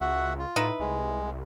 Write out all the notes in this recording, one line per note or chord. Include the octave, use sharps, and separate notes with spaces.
C#2 F#4 E5 F#5
F4
A2 D#4 E4 B4
C2 G#3